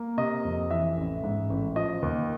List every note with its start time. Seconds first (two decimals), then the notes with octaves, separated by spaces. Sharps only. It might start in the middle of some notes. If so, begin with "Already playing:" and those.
Already playing: A#3
0.17 C3 D#5
0.44 F2
0.71 E3 E5
0.97 A1
1.24 G#2
1.50 A1
1.76 F3 D#5
2.02 D#2